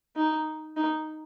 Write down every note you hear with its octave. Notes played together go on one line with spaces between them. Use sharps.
D#4
D#4